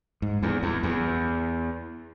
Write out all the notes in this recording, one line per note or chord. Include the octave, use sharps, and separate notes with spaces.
G#2
E2
E2
E2